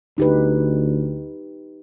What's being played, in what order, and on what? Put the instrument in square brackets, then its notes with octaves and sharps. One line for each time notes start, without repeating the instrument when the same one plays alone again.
[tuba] D2 [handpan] D#4 G4 B4